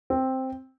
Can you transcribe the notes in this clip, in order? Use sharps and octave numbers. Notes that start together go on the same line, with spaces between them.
C4